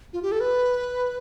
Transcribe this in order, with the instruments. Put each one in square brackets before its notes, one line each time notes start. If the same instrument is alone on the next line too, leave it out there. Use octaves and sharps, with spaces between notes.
[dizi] F4
G4
A4
B4